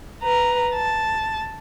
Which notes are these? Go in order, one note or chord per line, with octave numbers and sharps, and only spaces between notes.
B4 A#5
A5